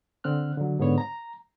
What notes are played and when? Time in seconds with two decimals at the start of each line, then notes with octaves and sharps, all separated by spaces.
0.24 D3 C4 F6 F#6
0.57 D3 F#3
0.79 G#2 D3 B3 C#5
0.98 A#5